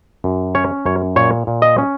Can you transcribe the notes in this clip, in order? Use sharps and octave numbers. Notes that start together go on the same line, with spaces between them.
F#2
C#4 C#5
F#2 C#5
A#2 C#5
A#2
D#5
C#4